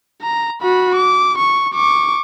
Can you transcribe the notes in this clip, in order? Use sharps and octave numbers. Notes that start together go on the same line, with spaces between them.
A#5
F#4 B5
D6
C#6
C#6 D6